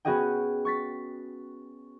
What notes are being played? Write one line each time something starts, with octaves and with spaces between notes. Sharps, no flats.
B3 C#4 F#4 G#4 D#5 G5
C#6 A6 B6